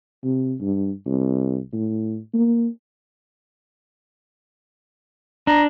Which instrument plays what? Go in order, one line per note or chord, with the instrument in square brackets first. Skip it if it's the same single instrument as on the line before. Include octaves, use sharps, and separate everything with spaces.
[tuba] C3
G2
C2
A2
A#3
[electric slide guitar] D4 [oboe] A#5